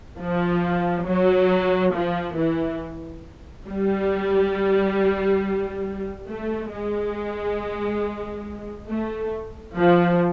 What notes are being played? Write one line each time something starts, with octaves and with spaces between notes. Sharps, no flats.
F3
F#3
F3
E3
G3
A3
G#3
A3
F3